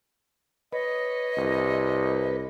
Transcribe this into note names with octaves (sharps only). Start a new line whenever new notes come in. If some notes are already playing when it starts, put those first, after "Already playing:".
B4 C#5 D#5
C2